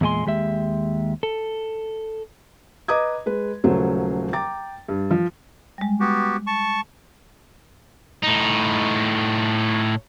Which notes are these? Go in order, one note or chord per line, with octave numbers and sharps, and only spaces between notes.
E2 A#2 G#3 G#5 C6
D#2 G#3 G4 E5
A4
B4 D#5 A#5 D6 D#6 G#6
G#3 B4
D#1 C#3 F#3 A3 C5
G5 A#5 D6 A6
G2
F3
G3 G#3
B3 F#4 G4
A5 C#6
A2 D#4